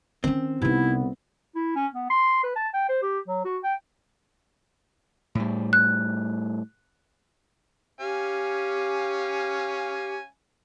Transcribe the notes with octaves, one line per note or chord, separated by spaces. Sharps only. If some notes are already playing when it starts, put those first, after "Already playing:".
D#3 C4 C#4
C2 C3 B3 D#4 E4
E4
C#4
B3
C6
B4
A5
G5
C5
G4
F#3
F#4
G5
A2 G3
F#6
C#4 G4 F5 G#5